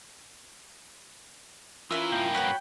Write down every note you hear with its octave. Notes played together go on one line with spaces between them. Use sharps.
E3 C#4 E4 F4 A#4
G2 A#3 G5
F#4 B4 C#5 F#5 B5 F#6